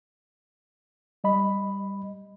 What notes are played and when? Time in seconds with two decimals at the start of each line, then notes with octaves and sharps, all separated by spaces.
1.24 G3 D#5 B5